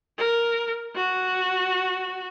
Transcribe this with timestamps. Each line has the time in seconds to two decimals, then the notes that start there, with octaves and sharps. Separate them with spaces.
0.18 A#4
0.96 F#4